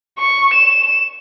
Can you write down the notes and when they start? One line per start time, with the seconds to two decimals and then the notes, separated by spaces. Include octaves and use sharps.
0.19 C#6
0.54 E7